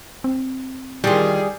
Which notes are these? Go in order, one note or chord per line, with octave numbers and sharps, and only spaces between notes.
C4
D#3 E3 G3 F4 G#4